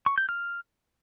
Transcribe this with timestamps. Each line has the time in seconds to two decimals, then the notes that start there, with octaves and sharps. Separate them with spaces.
0.06 C#6
0.18 G6
0.29 F6